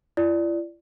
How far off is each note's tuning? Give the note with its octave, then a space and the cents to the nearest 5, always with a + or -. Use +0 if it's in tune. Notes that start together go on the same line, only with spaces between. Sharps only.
E4 +45 D5 +0